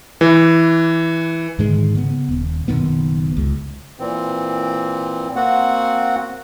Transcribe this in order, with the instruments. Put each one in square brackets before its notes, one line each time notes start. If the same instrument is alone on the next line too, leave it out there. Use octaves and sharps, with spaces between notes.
[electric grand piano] E3
[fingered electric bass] G#2 D3 D#3 G#3
C#3 B3
D#1
F#1 B2 D#3 B3
C#2
[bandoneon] A#2 E3 C4
A#3 C4 F#4 F#5